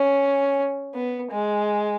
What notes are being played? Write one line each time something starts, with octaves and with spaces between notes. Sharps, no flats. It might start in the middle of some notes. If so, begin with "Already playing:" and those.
Already playing: C#4
B3
G#3